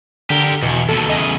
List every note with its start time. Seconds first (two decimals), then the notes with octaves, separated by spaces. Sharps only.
0.30 D3 G4 A#4
0.62 E2 B2
0.89 D#2 B2 A4
1.09 E2 C#3 D#5 D#6